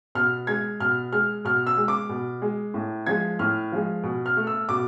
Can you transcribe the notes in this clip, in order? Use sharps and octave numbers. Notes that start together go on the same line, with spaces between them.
B2 F6
G#3 G#6
B2 F6
G#3 F6
B2 F6
E6
G#3
D6
B2
G#3
A2
F3 G#3 G#6
A2 F6
F3 G#3
B2
F6
A3
E6
B2 D6